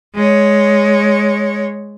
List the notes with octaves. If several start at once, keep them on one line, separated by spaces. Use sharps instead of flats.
G#3 C#5